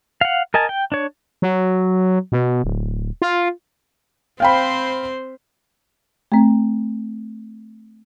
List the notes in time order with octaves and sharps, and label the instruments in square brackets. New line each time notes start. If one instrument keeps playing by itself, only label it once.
[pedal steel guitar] F5 F#5
A#4 D#5 G#5 A5
G5
D4 C#5
[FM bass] F#3
B2
D1
F4
[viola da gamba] C4 C5 [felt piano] F5 G5 B5
[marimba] A3 C4